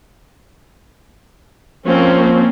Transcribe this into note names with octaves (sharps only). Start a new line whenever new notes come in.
F3 A#3 C4 C#4